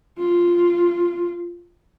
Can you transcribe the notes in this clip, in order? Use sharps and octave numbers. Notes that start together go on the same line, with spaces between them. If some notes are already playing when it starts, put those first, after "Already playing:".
F4